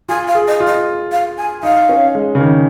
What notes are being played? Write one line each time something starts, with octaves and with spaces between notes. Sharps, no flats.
F4 G#5
F5
G#4
D#5
F4
D#5
F5
G#5
D#4 F5
C#4
G#3
C#3
D#3